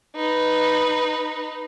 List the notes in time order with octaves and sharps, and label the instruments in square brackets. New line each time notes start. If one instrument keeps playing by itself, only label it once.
[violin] D#4 B4